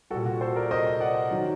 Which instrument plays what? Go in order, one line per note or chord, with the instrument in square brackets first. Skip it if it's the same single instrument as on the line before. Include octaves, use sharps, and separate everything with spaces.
[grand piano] G3 F#4 A4
A#2
F#4
A4 C5
A#4 D5
C5 D#5
D5 F#5
D#3 F#3